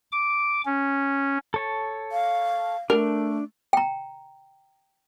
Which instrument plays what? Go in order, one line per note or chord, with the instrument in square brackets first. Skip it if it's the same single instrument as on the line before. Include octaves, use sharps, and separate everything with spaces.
[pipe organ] D6
C#4
[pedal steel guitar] A4 C#5 A5
[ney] F5
[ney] A3 [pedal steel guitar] D4 [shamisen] A#4
[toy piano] G5 A#5